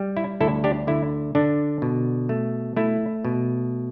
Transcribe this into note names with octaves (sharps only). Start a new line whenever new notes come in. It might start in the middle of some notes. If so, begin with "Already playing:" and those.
Already playing: G3
E4
D2 E4 A4
D4 G4
D3 E4
D3 D4
B2
A3
A3 E4
B2